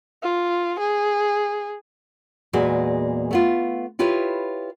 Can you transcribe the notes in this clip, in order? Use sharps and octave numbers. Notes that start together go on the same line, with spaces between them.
F4
G#4
E2 A#2 G#3 F#4 G#4 B4
A3 B3 F4
E4 F4 G4 B4 C#5